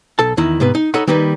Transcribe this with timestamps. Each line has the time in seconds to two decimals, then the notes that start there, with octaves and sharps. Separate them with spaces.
0.19 B1 A4 A5
0.37 E2 D#3 E4 A#5
0.60 G#2 C3 B3 B4
0.75 D#4
0.94 D#4 A4 C#5 D#5 F#5 B5
1.07 D#3 G3 A#3 D#4 B4